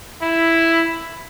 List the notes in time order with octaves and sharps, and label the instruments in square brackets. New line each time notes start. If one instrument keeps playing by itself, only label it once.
[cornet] E4